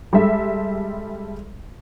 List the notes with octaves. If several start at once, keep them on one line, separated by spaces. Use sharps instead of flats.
G3 G#3 A4 E5